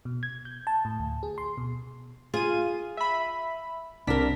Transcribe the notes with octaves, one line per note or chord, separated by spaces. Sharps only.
B2
G#6
G6
A5
A2
D2
G#4
C6
B2
F4 G#4 D#7
E5 B5
C2 D4 A#4 B6